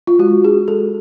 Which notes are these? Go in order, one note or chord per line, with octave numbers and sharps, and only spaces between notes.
F4
G#3 F#4
D4 G#4
G#3 A4